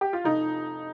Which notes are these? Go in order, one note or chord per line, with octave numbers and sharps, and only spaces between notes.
G4
F4
F1 D#4